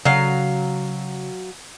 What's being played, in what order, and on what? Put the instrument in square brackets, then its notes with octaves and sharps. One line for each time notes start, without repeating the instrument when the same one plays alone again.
[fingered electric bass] C#3 [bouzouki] F#3 F5